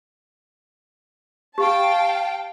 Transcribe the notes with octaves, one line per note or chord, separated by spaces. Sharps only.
G4 F5 G5 A5